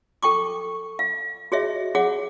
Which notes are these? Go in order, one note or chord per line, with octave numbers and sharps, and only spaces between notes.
A4 G5 C#6 D6
F5
F#4 G#4 C#5 D#5 E5
G#4 C#5 F#5 D6